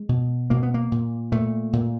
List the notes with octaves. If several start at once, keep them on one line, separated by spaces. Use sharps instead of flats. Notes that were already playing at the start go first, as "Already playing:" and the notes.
Already playing: G#3
B2
B2 A#3
B3
A#3
A#2
A#2 A3
A#2